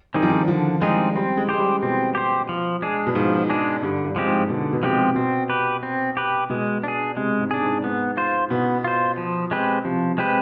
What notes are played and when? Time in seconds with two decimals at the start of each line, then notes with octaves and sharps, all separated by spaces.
0.14 D#3 G3 C4 D#4 G#4
0.22 F3
0.30 D#3
0.48 D3 F3
0.81 G3 G#3 C4 D#4 G#4
1.16 G3 C4
1.37 G#3
1.49 G#3 G4 C5
1.59 G3
1.83 B2 C4
2.15 G4 C5
2.49 F3
2.82 G#3 D4 G#4
3.07 B2
3.15 G#2 F3
3.50 G#3 D4 G#4
3.82 G2 D3
4.05 G2
4.16 F3 G#3 C4 G4
4.27 G#2
4.49 B2 D3
4.72 B2
4.83 C3 F3 G#3 C4 G4
5.16 B2 C4
5.49 G4 B4
5.83 C4
6.17 G4 B4
6.50 B2 G#3
6.84 D4 G#4
7.17 C3 G#3
7.39 G#2
7.51 D4 G#4
7.62 G#2
7.84 G#2 B3
8.17 F4 C5
8.50 B2 B3
8.84 F4 C5
9.18 F3
9.51 G#3 C4 G4 B4
9.85 C3 F3
10.18 G#3 C4 G4 B4